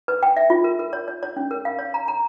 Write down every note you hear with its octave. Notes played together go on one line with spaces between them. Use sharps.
B4
G5
E5
F4
A#4
A#4
C#5
C#5
C#5
C#4
A#4
F5
C#5
A#5
A#5